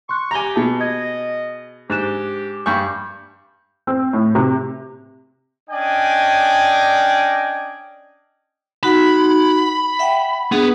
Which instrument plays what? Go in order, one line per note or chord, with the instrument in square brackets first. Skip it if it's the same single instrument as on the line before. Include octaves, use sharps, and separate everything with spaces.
[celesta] C6 F#6 [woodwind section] C#6
[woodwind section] G4 [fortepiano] G#5 A#5 [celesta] A#6 G7
[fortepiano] B2 G#4 [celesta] A5
[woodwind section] D#5 [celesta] G#6
[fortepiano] G#2 [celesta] D4 F#6 E7 [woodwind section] G4
[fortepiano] G2 C#6 [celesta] G#5 D6 G6
[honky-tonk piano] C4
A2
C3
[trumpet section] C#4 D4 D5 D#5 G5 G#5
[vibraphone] D#4 F#4 F#5 [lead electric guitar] B5
[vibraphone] E5 F#5 G5
[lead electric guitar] B3 [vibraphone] D4 G#4